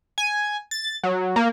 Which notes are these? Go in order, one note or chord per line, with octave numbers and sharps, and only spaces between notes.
G#5
A6
F#3
A#3